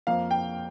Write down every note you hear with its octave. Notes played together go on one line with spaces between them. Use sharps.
F2 F3 A#3 F5
G5